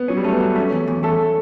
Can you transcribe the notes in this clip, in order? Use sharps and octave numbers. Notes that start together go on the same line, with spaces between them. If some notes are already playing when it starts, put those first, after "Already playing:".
Already playing: B3
F#3 C#4
G3
A3 C#4
B3
F#3
A3 C#4
E2
E2
A3 A4